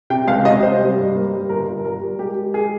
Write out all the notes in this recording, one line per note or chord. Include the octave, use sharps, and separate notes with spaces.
C3 G5
C#2 F5
C3 D#5
C3 C5
G3
G2
A#3
G3
G1 A#4
G1
G3 A#4
G3
G#3 G4
G#3
G#4